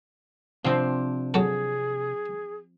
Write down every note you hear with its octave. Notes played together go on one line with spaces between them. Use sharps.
C3 F3 C4 D4
F#3 G#4 A4